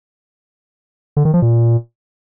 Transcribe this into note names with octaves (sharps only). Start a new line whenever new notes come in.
D3
D#3
F3
A#2